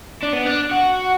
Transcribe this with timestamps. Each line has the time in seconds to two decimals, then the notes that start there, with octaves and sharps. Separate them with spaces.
0.23 D4
0.33 B3
0.46 D4
0.72 F#4